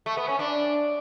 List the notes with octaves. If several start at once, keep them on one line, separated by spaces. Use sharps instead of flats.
A3
B3
C#4
D4